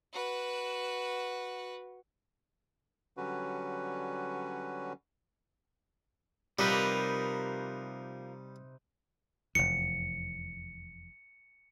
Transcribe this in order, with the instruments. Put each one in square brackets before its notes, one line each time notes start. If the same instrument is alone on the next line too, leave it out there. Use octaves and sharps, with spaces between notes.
[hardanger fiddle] F#4 B4
[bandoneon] D3 F#3 G3 C#4 F#4 B4
[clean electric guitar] C3 D#4 B4 [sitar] F3 A#3 [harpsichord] G3
[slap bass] F1 E2 [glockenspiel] C#7